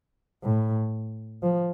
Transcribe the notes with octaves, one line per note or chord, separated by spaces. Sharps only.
A2
F3